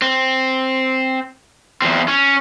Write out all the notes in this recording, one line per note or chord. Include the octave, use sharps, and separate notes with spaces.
C4
E2 C4
C#4